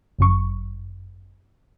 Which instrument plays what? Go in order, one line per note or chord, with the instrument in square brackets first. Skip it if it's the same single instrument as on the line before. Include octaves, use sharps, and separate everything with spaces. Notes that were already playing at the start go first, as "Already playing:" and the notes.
[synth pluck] G1 F#2 C#6